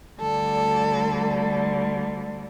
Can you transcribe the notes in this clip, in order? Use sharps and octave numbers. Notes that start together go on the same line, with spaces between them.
D2 D3 G3 A4